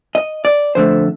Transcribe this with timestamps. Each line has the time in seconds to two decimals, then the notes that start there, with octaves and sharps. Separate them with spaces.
0.15 D#5
0.45 D5
0.75 F2 D3 A3 C5